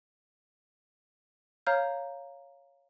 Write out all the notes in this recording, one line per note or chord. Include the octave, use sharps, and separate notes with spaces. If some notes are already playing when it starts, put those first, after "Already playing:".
C#5 F5 A#5 F6 G6